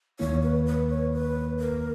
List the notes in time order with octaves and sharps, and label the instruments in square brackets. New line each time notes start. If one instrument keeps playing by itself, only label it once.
[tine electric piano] D#2 D#3 A#3 E4 [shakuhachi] C#5
[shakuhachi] B4
B4
C#5
B4
A#4